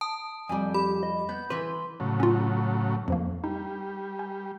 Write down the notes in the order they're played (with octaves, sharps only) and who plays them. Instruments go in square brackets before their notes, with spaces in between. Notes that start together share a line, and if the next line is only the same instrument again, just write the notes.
[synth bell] A5 [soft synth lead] D#6
[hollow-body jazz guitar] F2 G3 [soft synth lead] G#5
[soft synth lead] G4 [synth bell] B5
[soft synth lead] D#5
[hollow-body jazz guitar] B3 [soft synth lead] G6
[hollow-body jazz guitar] E3 B4 [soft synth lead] C6
[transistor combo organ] A2 C#3 F#3
[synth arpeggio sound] C#4 F4
F2 F3 A#3
[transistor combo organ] G3 [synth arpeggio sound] D#4
[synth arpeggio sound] G#5